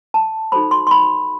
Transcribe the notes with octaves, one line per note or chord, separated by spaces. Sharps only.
A5
D#4 F#4 A4 C5 B5
C6
C6
B5